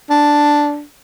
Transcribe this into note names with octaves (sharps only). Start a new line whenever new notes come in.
D4